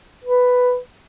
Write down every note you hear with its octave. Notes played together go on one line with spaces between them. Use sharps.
B4